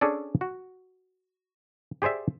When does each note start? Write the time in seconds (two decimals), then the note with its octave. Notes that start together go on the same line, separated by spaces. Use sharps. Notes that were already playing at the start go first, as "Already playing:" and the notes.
0.01 C#4 D4 G#4 A4 D5
0.41 F#4
2.02 G4 G#4 C5 D5 E5